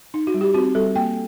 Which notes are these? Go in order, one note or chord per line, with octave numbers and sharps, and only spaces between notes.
D#4
F#4
G3
G4
C4 F#4
G3 A4
A#3 G5